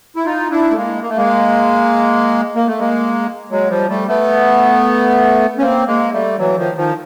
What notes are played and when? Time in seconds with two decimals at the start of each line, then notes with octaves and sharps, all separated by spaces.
0.16 E4
0.25 D#4 F4
0.51 D4 E4
0.71 A3
0.76 G#3 A#3
1.02 A#3
1.10 A3
1.17 G#3 A#3
2.55 A#3
2.67 A3
2.79 G#3 A#3
3.51 F#3 G#3
3.70 F3 G3
3.90 G3 A3
4.08 A3 B3
5.58 C#4
5.61 A#3 C4
5.87 G#3 A#3
6.13 G3 A3
6.39 E3 F#3
6.58 D#3 F3
6.77 D#3 F3